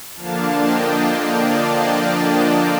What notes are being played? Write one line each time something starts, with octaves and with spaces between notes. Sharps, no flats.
D3 F3 A#3 D4 F5 A5
D#5 G5
D5 F5
D5 F5